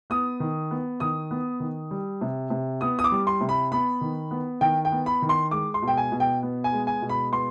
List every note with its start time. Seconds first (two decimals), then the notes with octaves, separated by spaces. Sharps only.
0.10 B3 D#6
0.40 D#3
0.71 B3
1.00 D#3 D#6
1.31 B3
1.60 D#3
1.91 G3
2.21 C3
2.50 C3
2.81 B3 D#6
2.99 D#6
3.04 D6
3.12 G3
3.27 C6
3.41 C3
3.49 B5
3.72 B3 B5
4.01 D#3
4.31 B3
4.61 D#3 G5
4.85 G5
4.92 B3
5.06 B5
5.22 D#3
5.29 C6
5.51 G#3 D6
5.74 C6
5.82 B2
5.88 G5
5.97 G#5
6.12 B2
6.20 G5
6.43 B3
6.64 G#5
6.73 G#3
6.87 G#5
7.02 B2
7.09 B5
7.32 B3 C6